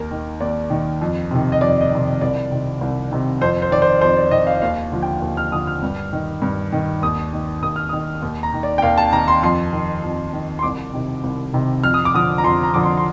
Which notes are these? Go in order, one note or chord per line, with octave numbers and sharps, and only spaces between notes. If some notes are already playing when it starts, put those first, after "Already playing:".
Already playing: D#2 A#4
D#3
D#2 D5
D#3
F2
C3 D#3
D#5
F2 D5
D#5
C3 D#3
C2 D5
C3 D#3
C2
C3 D#3
F2 C5
C5
D#3 D5
C5
F2 C5
D5
D#3 D#5
F5
D#2 F5
D3 F3
G5
D#2
F6
D3 F3 D#6
F6
G2
D#3
G2
D#3
D#2 D#6
D#3
D#2 D#6
F6
D#3 D#6
D#2
A#5
D#3
D5
G5
D#2 F5
A5
D#3 A#5
C6
F2 C6
D#3
F2
D#3
C6
C2 D6
C3 D#3
C2
C3 D#3
F2 F6
D#6
D6
D3 F3 D#6
A#5
F2 C6
A#5
D3 F3 D6
C6
C6